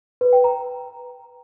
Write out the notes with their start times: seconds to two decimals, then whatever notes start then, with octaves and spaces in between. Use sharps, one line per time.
0.21 B4
0.33 G5
0.44 A#5